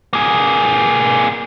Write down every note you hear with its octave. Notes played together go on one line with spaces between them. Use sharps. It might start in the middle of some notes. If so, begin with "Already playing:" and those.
A#3 G#4